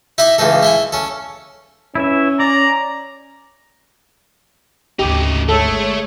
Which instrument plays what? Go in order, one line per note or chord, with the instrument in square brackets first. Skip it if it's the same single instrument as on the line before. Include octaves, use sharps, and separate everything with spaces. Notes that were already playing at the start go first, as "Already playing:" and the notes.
[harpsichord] D#4 E4 E5 B5 D6 D#6
C#2 C#3 E3 D#4 A4
E4 G5 G#5
C#4 A4
[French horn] C#4 [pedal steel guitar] E4 B4 E5
[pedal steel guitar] D5 [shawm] A#5
[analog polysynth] G#1 D2 [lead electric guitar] C#3 D#4 [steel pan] G4
[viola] G#3 C#5 [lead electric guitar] A3 [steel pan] A4